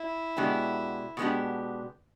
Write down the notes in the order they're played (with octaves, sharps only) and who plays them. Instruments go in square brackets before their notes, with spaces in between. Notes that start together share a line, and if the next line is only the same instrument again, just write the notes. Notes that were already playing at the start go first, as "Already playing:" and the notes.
Already playing: [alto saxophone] E4
[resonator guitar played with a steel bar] B2 G#3 B3 D4 G4
B2 G#3 B3 D4 G4